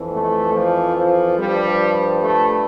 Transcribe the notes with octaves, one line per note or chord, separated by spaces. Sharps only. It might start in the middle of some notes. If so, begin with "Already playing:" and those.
Already playing: F2 E3
A3
F3
F3
G2 F3 G3
A3